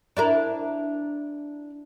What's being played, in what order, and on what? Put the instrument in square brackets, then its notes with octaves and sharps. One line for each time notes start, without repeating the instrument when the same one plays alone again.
[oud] D4 E4 A#4